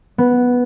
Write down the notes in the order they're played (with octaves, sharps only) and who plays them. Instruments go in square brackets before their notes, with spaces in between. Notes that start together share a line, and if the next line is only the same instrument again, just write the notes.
[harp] B3